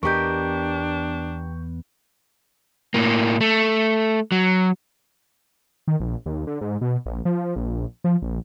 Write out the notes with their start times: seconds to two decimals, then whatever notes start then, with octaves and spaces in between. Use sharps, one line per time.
0.03 E2 B3 D4 G4 A#4 D#5 C#6 G6
2.94 A2 A#3
3.41 A3
4.32 F#3
5.88 D#3
6.00 A#1
6.26 D#2
6.47 D3
6.61 G#2
6.81 B2
7.06 A#1
7.25 F3
7.56 A#1
8.04 F3
8.22 A#1